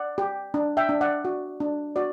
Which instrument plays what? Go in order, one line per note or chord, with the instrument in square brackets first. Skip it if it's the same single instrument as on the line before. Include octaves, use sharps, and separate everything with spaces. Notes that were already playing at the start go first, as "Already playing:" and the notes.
Already playing: [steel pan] D5 F#5
G4
D4
E5 G5
D4
D5 F#5
F#4
D4
F#4 D5